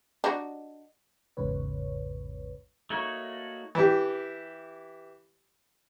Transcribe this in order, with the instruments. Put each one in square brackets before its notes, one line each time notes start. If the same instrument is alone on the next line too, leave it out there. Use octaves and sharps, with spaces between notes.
[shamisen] D4 D#4 F#4
[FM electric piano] A1 E2 G#2 C#3 B4 C#5
[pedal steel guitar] A3 A#3 D#4 F#4 C#5
[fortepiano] E3 G4